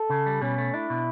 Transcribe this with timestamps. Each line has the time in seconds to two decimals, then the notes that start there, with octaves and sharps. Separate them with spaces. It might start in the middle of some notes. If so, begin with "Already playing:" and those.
Already playing: A4
0.10 C#3
0.26 G3
0.41 B2 C#4
0.58 A3
0.74 D4 E4
0.90 B2